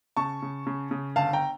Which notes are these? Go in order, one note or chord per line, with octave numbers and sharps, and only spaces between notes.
C#3 A5 C#6
C#3
C#3
C#3
G1 F5 A5
G5 A#5